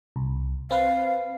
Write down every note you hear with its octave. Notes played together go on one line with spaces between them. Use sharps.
C2
C4 B4 F5